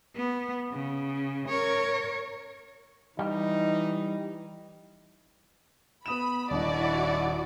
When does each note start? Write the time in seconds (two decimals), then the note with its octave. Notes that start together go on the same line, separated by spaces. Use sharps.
0.15 B3
0.73 C#3
1.48 A#4 C#5
3.19 E3 G3 D#4
6.06 B3 B5 D#6 E7
6.51 D#1 D4 E4 F#4 D5 D#5